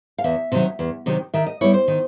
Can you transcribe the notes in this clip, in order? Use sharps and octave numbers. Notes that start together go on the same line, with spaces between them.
F5
E2 E5
C3 D#3 F#3
E2
C3 D#3 F#3
D#3 E5
D#5
G3 B3 E4 C#5
C5
D#3